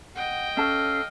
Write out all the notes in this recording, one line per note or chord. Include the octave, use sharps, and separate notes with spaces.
D#5 F#5 G5
C#4 A4 F5 A5